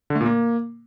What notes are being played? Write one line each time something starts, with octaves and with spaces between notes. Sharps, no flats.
D3
A3
A#2
A#3